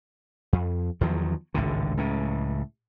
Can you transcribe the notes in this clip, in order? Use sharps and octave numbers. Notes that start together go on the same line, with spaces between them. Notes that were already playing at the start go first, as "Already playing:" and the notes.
F2
E2 D#3 F3 F#3
G#1 C#2 A2 D3
C#2 A2 C#3